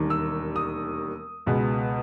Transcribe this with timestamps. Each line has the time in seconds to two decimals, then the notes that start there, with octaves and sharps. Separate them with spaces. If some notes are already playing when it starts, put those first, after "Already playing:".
Already playing: E1 D#2 D#3 G3
0.10 E6
0.56 D#6
1.46 C#2 B2 G#3 B3